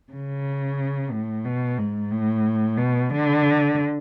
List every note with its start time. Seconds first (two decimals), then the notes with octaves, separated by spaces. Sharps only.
0.13 C#3
1.12 A2
1.45 B2
1.78 G#2
2.11 A2
2.77 B2
3.10 D3